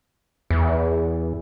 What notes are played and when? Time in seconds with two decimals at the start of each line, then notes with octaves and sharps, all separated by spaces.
0.50 E2